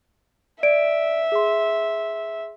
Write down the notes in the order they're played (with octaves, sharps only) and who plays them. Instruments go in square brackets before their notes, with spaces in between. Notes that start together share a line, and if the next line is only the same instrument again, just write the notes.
[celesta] D5 D7 [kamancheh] E5
[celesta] G#4 C6